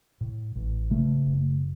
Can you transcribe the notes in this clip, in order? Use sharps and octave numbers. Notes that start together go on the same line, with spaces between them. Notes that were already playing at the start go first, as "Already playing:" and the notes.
A2
A1
C#3 A3
F#1